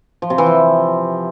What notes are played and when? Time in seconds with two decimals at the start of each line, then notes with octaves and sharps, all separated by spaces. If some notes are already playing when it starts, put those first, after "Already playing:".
0.22 F3
0.30 C3
0.38 E3
0.46 F3